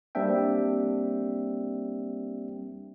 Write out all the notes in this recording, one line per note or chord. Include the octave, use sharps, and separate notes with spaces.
G3 A#3 C4 D4 E5 G5